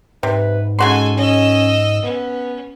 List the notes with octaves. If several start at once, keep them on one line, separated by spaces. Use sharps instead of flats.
G#2 C3 B4
C#3 G#3 F#4 A4 G#5 C6
C#4 D#5 E6
B3 C#4